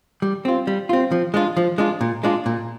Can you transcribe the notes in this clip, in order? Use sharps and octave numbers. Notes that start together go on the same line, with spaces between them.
G3
C4 F4
G3
C4 F4
F3
G#3 D4 F4
F3
G#3 D4 F4
A#2
G#3 D4 F4
A#2